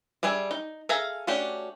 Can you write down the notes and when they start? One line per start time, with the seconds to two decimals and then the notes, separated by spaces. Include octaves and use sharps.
0.23 G3 D4 G#4 E5
0.51 D#4
0.89 G#4 A4 E5 F5 A#5
1.27 A3 C#4 D4 F#4 G4